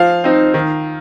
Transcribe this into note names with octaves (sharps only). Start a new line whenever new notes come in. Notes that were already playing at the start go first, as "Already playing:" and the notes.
Already playing: F3 F5
C4 D#4
D#3